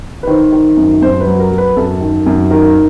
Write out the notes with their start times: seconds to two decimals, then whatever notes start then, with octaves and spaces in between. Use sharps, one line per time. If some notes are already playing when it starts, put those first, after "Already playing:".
0.23 B4
0.27 D#3 C5
0.52 D#3
0.77 F#2
1.02 F#2 C5
1.21 B4
1.26 F#3
1.39 A#4
1.51 F#3
1.58 B4
1.76 F#2 A4
2.01 D#3
2.26 F#2
2.51 D#3 A#4